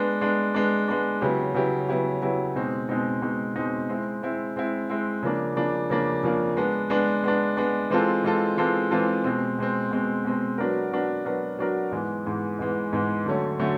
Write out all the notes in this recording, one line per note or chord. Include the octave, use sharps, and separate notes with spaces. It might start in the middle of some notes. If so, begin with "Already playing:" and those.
Already playing: G#3 B3 D4
G#3 B3 D4
G#3 B3 D4
G#3 B3 D4
C#3 F#3 B3 E4 G4
C#3 F#3 B3 E4 G4
C#3 F#3 B3 E4 G4
C#3 F#3 B3 E4 G4
B2 G#3 C4 D#4
B2 G#3 C4 D#4
B2 G#3 C4 D#4
B2 G#3 C4 D#4
G#3 C4 E4
G#3 C4 E4
G#3 C4 E4
G#3 C4 E4
C#3 F3 A#3 D4
C#3 F3 A#3 D4
C#3 F3 A#3 D4
C#3 F3 A#3 D4
G#3 B3 D4
G#3 B3 D4
G#3 B3 D4
G#3 B3 D4
E3 G#3 C4 F4 A4
E3 G#3 C4 F4 A4
E3 G#3 C4 F4 A4
E3 G#3 C4 F4 A4
B2 G#3 C4
B2 G#3 C4
B2 G#3 C4
B2 G#3 C4
F#3 B3 D4 F#4 A#4
F#3 B3 D4 F#4 A#4
F#3 B3 D4 F#4 A#4
F#3 B3 D4 F#4 A#4
G#2 E3 G#3 B3
G#2 E3 G#3 B3
G#2 E3 G#3 B3
G#2 E3 G#3 B3
D3 F#3 A3 C#4
D3 F#3 A3 C#4